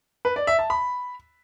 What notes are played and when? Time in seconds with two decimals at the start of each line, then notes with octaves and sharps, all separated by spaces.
0.25 B4
0.36 D5
0.47 E5
0.59 A5
0.70 B5